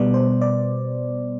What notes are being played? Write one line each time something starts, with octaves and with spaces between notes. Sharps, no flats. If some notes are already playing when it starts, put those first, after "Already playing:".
Already playing: B2 G3 B3 D5
C5
D5